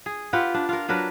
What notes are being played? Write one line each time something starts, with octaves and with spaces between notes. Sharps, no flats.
G#4
F4 G4 B4 F#5
D4
F4 A#4
F#3 D4 A#4 B4